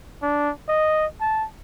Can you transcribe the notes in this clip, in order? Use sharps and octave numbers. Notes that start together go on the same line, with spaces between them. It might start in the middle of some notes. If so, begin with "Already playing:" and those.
D4
D#5
A5